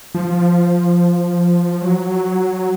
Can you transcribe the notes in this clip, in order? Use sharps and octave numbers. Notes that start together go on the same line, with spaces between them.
F3
F#3